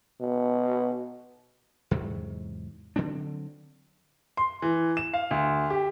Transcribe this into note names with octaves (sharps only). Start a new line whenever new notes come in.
B2
E2 G#2 C3 F#3
D3 F#3 C4 D4
C6
E3
E7
F5
D2
G4